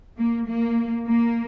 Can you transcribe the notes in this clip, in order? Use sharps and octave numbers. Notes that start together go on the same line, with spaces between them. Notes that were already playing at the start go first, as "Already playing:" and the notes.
A#3
A#3
A#3